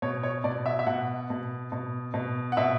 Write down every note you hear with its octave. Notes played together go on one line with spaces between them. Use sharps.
B2 C#5
C#5
B2 D5
E5
E5
B2 F#5
B2
B2
B2
F#5
B2 E5